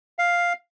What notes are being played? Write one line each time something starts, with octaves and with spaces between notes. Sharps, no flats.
F5